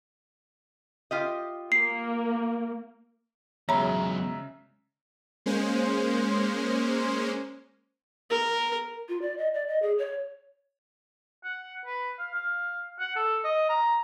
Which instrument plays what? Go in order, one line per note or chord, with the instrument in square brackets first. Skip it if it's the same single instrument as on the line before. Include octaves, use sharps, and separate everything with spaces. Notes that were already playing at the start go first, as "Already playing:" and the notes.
[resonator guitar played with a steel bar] F4 G4 D#5
[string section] A#3 [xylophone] C7
[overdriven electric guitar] E2 F#3 [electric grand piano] C#3 G#3 E5 [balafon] C#5 B5 [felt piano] A#5
[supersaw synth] G#3 A#3 C#4 C5
[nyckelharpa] A#4
[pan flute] F4
D5
D#5
D5
D#5
G#4
C#5
[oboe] F#5
B4
F5
F5
F#5
A4
D#5
A#5